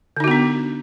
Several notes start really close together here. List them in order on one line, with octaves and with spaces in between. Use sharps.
D3 D#4 F#4 B3 D4